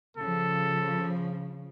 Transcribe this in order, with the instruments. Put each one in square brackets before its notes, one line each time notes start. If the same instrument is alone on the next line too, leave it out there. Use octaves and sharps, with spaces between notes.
[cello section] C#3 F3 [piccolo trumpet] A4